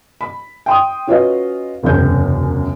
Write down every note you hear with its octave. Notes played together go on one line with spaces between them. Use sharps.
B5
G5 C6 D#6
C#4 F4 F#4 B4 D#5 F5
E1 C#2 F#2 C3 C4 G6